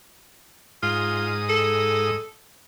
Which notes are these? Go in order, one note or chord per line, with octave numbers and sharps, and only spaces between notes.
G#2 F4 D#6
A4